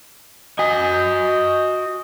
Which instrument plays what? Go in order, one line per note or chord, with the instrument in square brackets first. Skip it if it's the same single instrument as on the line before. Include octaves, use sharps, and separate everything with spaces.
[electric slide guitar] F#4 G#5 [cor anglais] D#5